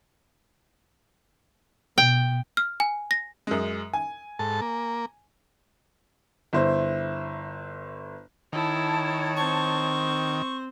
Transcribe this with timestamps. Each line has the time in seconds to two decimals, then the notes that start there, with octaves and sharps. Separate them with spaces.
1.98 B2 G5
2.57 F6
2.80 G#5
3.11 A#6
3.47 F#2 G#3
3.93 G#5
4.39 G#2 A4 A5
4.61 A#3
6.53 G1 E4 C5
8.53 D#3 E4 C#5 A5
9.36 C4 C5 C#6